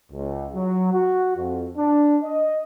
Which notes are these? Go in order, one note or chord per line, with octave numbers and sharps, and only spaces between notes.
C#2
F#3
F#4
F2
D4
D#5